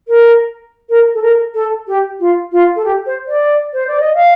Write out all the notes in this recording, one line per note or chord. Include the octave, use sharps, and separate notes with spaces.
A#4
A#4
A4
A#4
A4
G4
F4
F4
A4
G4
C5
D5
C5
D5
D#5
F5